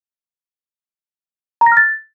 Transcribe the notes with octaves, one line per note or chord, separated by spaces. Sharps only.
A#5
A#6
F6
A6